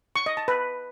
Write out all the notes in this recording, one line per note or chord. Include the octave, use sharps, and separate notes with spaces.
C#6
D#5
A5
B4